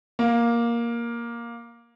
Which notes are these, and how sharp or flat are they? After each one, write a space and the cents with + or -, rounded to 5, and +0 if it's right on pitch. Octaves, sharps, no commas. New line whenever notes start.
A#3 +10